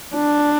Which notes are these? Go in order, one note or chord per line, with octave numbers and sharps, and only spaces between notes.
D4